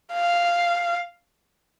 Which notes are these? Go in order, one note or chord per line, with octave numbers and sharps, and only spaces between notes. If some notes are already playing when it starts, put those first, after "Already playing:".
F5